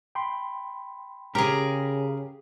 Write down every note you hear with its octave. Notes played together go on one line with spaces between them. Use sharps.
G5 B5 C6
C#3 G4 G#4 A#4 A#5